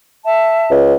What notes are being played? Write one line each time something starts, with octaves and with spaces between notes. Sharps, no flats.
E5 A5
C#2